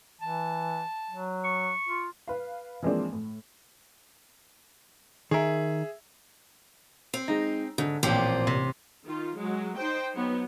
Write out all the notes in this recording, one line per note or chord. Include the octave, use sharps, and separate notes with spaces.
E3 A5
F#3
C#6
F4
B4 F5
E3 F3 G#3 A#3 C4 D4
A2
D#3 G#4 A#4 E5
C4
G#3 D#4 A#5
G#2 D3
A1 A#2 F3 C4 G4
C3
D#3 F4
F#3 G#3
D#4 C5 G5
F#3 B3 D#4 C#5